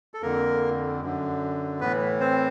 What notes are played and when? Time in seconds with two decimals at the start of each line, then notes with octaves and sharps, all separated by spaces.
0.14 A4
0.22 F2 D3 A#3 A#4
1.02 F#2 D3
1.80 A2 E3 B3 B4
2.20 C4 C5